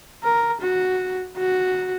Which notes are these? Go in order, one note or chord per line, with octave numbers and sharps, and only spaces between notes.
A#4
F#4
F#4